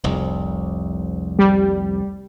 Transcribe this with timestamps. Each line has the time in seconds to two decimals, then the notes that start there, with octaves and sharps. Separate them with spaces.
0.04 F1 C2
1.39 G3